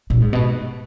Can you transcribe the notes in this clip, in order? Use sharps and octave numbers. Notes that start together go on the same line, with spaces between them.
A#2
G#2
B2